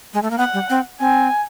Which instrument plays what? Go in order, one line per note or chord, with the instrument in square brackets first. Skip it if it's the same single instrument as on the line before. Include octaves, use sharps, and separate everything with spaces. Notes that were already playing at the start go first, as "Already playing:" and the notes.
[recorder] G#3
A3
A#3
[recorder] B3 [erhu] F#5
[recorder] G3
C4
[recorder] C4 [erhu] G#5